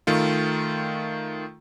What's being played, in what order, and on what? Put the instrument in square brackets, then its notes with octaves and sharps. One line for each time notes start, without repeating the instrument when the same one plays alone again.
[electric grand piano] D#3 A3 F4